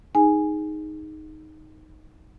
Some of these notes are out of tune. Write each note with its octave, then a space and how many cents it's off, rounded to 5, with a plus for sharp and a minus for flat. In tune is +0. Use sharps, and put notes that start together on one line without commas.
D#4 +0 G#4 +0 G#5 +0